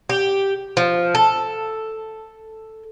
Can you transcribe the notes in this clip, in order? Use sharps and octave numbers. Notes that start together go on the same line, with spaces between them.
G4
F3
A4